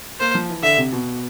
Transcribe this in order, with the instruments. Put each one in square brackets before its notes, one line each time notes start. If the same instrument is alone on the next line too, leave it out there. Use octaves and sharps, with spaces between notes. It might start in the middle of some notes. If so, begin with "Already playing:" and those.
[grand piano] A#3 [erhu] C5
[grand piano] F3
E3
[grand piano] D3 [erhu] E5
[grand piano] C3
B2